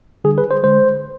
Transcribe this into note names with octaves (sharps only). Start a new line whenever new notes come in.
D3 G3 G#4
B4
C5
D3 G#3 C5